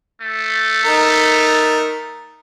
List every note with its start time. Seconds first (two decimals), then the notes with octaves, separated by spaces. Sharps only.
0.21 A3
0.85 D#4 A#4